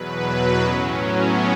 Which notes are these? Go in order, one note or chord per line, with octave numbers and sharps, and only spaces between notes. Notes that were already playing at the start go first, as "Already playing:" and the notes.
Already playing: E2 B2 F#3 B4
A2 F#3 C#4
B3